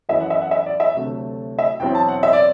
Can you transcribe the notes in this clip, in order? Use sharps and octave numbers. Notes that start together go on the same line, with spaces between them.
F#2 E3 B3 E4 E5
F#5
E5
F#5
E5
D5
E5
D2 C3 F#3 A3
E5
E2 B2 F#3 C4 E4 G5
A5
F#5
E5
D5